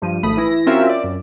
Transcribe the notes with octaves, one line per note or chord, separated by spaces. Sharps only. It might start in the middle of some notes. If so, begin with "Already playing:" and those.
G2 F3 D#7
G#1 A3 B5 D#6
E3 E4 A#6
C4 C#4 F4 F#4 A#4 E5
D5
F#2